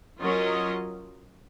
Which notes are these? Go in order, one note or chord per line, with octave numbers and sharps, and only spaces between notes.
F#3 C#4 F4 A#4 D#5